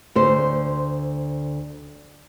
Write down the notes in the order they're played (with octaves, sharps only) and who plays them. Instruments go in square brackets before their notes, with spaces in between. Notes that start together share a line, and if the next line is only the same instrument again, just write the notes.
[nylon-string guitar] D2 C5